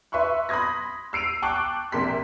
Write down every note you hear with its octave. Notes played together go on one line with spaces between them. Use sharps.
B4 E5 C6 C#6 F#6
B5 C6 D#6 G#6 A#6
E6 C7 D7 D#7 F7
G5 A5 C#6 D6 F#6
A#1 C3 A#3 C6 B6